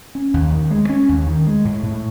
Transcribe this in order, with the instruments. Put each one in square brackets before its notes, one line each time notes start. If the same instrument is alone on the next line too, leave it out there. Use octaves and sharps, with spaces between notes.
[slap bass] C#4
D#2
D#3
G#3
C#4
D#2
D#3
G#3
A2
A2